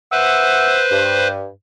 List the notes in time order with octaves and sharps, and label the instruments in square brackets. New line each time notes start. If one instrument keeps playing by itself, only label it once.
[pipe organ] B4 C5 [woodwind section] E5 F#5 E6
[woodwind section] G2